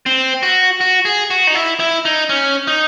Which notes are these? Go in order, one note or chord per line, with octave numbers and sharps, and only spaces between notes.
C4
F#4
F#4
G#4
F#4
D#4
E4
E4
D#4
C#4
D#4